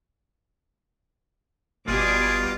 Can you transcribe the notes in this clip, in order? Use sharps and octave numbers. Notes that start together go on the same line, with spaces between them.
G1 B2 G3 F4 G#4 D6